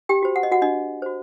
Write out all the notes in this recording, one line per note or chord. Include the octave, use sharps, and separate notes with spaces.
G4 G5
F#4 C5
F#5
D#5
F#4 F#5
D4 D#5
F#4 C5